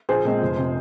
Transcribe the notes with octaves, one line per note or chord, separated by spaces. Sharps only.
A#1 G#4 C5
A#2 G#3 C4
F1
C3